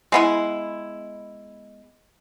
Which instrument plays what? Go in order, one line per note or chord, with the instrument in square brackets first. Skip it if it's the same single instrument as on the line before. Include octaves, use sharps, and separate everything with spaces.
[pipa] G#3 B3 E4